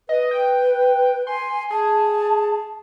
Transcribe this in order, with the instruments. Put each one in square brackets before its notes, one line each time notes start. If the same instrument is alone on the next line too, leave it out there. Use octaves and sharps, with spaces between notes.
[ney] B4 [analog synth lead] D#5
[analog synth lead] G5
[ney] G#5 [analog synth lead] C6
[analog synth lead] G#4 [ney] A5